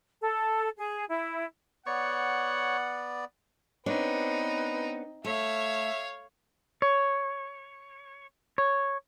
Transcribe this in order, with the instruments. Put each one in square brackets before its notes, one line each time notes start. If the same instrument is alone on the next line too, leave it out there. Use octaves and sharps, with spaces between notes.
[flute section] A4
G#4
E4
[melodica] B3 D5 [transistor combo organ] C#5 [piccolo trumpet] F#5
[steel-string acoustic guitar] B3 D4 C#5 [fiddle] C4 D#4 [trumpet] B4
[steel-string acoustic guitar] A3 [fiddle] C#5 F5 [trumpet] E5
[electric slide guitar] C#5
C#5